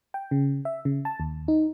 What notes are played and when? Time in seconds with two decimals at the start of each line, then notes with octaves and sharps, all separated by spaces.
0.14 G5
0.31 C#3
0.65 E5
0.85 C#3
1.05 A5
1.20 D#2
1.48 D#4